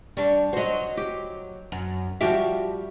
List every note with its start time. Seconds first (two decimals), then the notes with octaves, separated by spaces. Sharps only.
0.17 G3 D4 C#6
0.53 F#3 F#4 C5 D#5
0.97 G4
1.72 F#2
2.21 F3 G3 F#4 G4 E5 D6